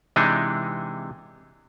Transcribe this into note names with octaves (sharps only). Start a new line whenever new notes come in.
C3 E3 G#3 D4 D#4